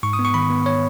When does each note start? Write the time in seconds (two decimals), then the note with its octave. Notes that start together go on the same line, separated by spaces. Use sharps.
0.03 G#2 C#6
0.13 D#6
0.19 B3
0.25 C#6
0.34 D#3 B5
0.50 B3
0.66 C#5